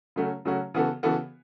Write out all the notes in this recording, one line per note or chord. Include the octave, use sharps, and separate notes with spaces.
C#3 F#3 A3 C#4 F#4
C#3 F#3 A3 C#4 F#4
C#3 E3 B3 F#4 A4
C#3 E3 B3 F#4 A4